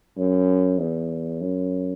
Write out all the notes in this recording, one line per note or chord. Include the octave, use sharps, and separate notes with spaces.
F#2
E2
F#2